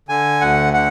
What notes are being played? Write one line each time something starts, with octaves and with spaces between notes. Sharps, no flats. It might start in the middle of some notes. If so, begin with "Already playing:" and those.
D3 G#5
D2 F#5
D3 F#5